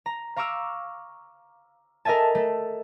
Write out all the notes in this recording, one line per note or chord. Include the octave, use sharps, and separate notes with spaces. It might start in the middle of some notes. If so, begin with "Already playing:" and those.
A#5
F5 A#5 C#6 D6 E6 F6
A4 A#4 D#5 E5 G#5 A5
A3 A4